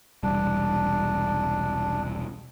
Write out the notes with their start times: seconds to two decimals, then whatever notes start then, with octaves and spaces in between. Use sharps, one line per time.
0.23 E1 C2 G3 D4